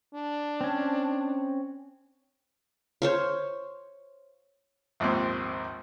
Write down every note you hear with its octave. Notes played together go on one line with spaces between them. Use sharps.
D4
C4 C#4
C5 C#5 F5
A#1 D#2 G#2 C4